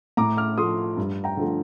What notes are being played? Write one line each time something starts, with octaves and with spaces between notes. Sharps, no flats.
A2 A#5 D6
D6 F6
F3 A3 C6 D#6
G2
G5 A#5
D3 F3 A3